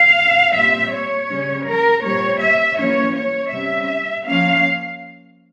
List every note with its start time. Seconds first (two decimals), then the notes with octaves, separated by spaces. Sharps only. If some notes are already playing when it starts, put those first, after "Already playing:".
Already playing: F5
0.56 A#2 G3 C4 E5
0.93 C#5
1.30 C#3 G3 C#4
1.67 A#4
2.04 A#2 G3 C4 C#5
2.41 E5
2.78 E3 G3 A#3 C#4 C#5
3.15 C#5
3.52 C3 G3 C#4 E5
4.26 F3 A#3 C#4 F5